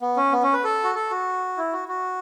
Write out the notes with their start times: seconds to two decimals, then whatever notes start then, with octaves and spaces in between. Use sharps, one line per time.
0.02 B3
0.17 C#4
0.32 B3
0.43 C#4
0.53 B4
0.64 A4
0.84 F#4
0.95 A4
1.10 F#4
1.57 E4
1.73 F#4
1.88 F#4